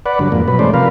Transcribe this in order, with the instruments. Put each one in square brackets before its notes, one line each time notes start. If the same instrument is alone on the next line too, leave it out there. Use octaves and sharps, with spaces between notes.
[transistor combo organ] B4 D5 F#5
G2 D3 F#3
F2 G#2 A#3
B2 F#3 B4
E3 G#3 A3 C#4 C5 D5
C3 F3 A#4 B4 F5